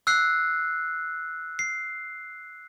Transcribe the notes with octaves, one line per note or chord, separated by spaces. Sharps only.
E6 F#6 C7
C7